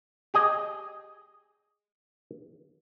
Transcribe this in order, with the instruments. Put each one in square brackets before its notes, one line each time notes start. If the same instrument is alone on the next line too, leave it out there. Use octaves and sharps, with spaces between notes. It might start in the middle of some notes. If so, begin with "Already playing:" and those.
[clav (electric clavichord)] G4 G#4 D#5